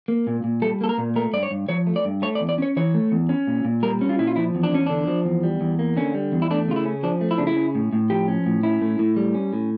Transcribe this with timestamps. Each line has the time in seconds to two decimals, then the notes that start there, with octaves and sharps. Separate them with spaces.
0.08 A#3
0.27 A#2
0.44 A#2
0.62 G3 A4
0.81 A#3 A4
0.89 A#4
0.98 A#2
1.16 A3 A#4
1.33 G2 D5
1.43 C#5
1.51 G2
1.69 F3 C#5
1.87 A3
1.96 D5
2.05 G2
2.22 A3 C#5
2.35 D5
2.41 E2
2.49 D5
2.58 C#4 C#5
2.77 E3 C#5
2.94 A3
3.12 E2
3.29 C#4
3.47 A#2
3.65 A#2
3.83 G3 A#4
4.01 C#4
4.09 F4
4.18 A#2 E4
4.27 F4
4.36 F3 E4
4.55 E2
4.63 D4
4.72 E2 C#4
4.86 D3 D4
5.07 F3
5.25 E2
5.43 G3
5.61 E2
5.79 A#3
5.97 D3 C#4
6.14 G3
6.32 E2
6.42 E4
6.50 A3 D4
6.68 C#3 F4
6.76 E4
6.85 C#4
7.03 F3 D4
7.21 A3
7.31 E4
7.38 C#3 D4
7.47 E4
7.57 C#4
7.75 A2
7.93 A2
8.10 F3 G4
8.28 C#4
8.46 A2
8.63 C#4 E4
8.82 A2
8.99 A2
9.17 G3
9.34 C#4
9.53 A2